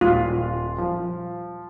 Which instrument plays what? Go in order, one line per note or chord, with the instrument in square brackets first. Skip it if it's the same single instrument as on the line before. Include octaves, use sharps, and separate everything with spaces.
[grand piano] D#1 [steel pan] F4
[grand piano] F3